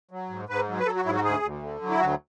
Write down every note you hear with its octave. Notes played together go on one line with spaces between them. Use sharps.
F#3
G#2
G#2 B4
F#3
B4
F#3 A4
F#4
G#2 E4
F#4
D2 G#4
D2
D3
F#3
E4
D2 F#4